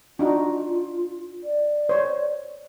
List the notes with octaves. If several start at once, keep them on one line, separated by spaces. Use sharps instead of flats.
D4 D#4 F4 F#4
D5
C5 C#5